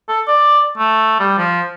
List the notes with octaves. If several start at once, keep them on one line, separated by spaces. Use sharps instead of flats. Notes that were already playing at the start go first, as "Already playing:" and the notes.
A4
D5
A3
G3
F3